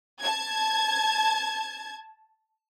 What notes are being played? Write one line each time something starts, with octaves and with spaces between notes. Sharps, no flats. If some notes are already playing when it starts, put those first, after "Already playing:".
A5 G#6